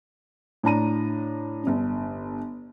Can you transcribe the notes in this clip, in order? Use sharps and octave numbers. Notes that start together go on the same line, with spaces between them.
A2 D4 A#5 D#7
G1 D4